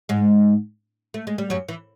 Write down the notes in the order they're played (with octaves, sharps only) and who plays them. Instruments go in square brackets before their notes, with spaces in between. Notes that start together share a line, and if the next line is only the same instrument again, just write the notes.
[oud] G#2 G#3
A3
G#3
G3
F#2 F#3
E3